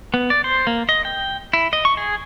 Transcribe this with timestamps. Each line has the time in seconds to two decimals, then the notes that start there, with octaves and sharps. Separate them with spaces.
0.14 B3
0.30 D5
0.44 C5
0.67 A#3
0.89 D#5
1.05 G5
1.53 E4
1.73 D#5
1.85 C#6
1.97 G#4